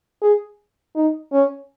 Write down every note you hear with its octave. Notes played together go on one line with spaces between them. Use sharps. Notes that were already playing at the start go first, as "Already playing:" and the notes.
G#4
D#4
C#4